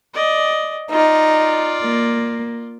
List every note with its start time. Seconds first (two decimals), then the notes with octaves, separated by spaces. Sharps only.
0.14 D5 D#5
0.91 D#4 F4 D5
1.81 A#3